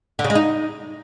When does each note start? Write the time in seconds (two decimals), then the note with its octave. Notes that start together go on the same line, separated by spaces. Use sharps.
0.19 D3
0.24 C#3
0.30 G#3
0.35 D#4